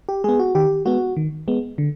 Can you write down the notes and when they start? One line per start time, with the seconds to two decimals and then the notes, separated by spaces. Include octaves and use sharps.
0.09 G4
0.24 G#3 B3 G#4
0.39 F#4
0.55 D#3 G4
0.85 G#3 B3 F#4
1.17 D#3
1.48 G#3 B3
1.78 D3